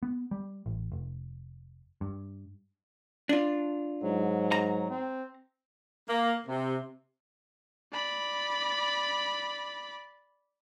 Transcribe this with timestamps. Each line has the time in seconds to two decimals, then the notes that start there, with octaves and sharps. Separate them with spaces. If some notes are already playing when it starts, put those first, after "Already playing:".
0.03 B3
0.31 G3
0.66 A1
0.92 F1
2.01 G2
3.29 D4 F4
4.03 G#2 F#3
4.52 F#3 A#5
4.90 C4
6.09 A#3
6.46 C3
7.93 D5 B5